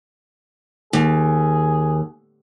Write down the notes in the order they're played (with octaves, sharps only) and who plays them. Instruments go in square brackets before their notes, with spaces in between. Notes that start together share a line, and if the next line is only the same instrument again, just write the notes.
[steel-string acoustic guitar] D#2 [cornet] G#4